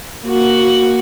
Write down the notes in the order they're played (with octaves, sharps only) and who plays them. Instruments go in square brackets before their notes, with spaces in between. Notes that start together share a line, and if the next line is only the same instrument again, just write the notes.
[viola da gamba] A#3 F#4